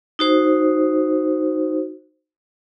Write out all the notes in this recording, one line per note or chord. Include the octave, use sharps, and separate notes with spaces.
D#4 F#4 C5